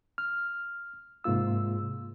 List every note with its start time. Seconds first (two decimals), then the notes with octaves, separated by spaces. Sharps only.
0.18 F6
1.24 G#2 C3 A#3 F4 E6